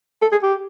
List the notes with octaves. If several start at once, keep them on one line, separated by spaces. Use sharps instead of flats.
A4
G#4
G4